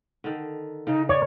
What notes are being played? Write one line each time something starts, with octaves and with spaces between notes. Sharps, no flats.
D3 D#3
C#3 D#4
C#5 D5